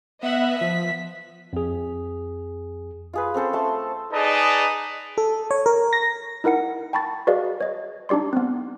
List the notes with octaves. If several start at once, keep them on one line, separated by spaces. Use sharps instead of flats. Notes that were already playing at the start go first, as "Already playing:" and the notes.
B3 D#5 E5 F#5
F3 B6
F2 G#4
F4 G#4 B4
C4 C#4 A4 C5
A3 A5 C6
D#4 G#4 B4 D5 D#5 A5
A4
C#5
A#4
A#6
D#4 E4 A#4 F#5 C#7
G5 A5 B5 C#6 A6
F#4 G#4 B4 D5 D#5 F5
C#5 D#5
D4 D#4 G4 D5 C6
B3 C4